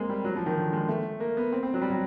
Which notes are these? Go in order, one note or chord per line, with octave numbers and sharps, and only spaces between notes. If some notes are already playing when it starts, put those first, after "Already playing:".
Already playing: G#3 A#3 C4
G3
F#3
F3
D#3
D3
G#3
A3
A#3
B3
C4
C4
F#3
G3
F#3